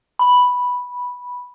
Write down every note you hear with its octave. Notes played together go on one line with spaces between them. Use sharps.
B5